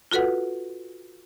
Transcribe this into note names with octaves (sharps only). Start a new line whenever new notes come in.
F4 F#4 A4 B4 F#5